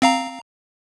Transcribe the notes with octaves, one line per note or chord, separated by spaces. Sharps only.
C4 F5 A#5